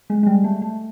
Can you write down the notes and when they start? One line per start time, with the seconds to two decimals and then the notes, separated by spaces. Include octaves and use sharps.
0.10 G#3
0.23 G#3
0.26 G3
0.44 A3
0.62 A3